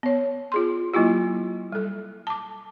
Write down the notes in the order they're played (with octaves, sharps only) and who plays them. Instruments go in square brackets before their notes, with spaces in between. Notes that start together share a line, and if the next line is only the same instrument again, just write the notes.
[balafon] B3 C#5
F4 G#4 C6
F#3 A#3 E4 F4 G4
G3 A4
A5 D6